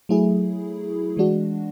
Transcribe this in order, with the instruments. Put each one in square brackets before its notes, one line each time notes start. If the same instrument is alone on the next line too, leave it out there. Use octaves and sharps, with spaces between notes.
[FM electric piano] F#3 A3 E4 G#4
E3 G#3 D4 F#4